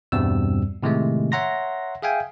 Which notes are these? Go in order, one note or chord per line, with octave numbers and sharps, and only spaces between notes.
E2 G2 B2 G3 C4 E6
A2 C3 D#3 G#3 A3
C#5 E5 F#5 A#5 C6 A#6
G#4 E5 F5 G5 G#5